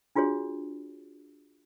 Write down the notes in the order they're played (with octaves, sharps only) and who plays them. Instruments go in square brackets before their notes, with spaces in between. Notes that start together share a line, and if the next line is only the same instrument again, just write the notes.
[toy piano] D4 F4 F#4 G#4 C#5